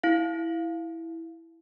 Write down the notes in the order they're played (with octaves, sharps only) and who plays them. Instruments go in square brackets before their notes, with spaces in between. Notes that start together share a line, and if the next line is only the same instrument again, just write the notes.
[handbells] E4 F5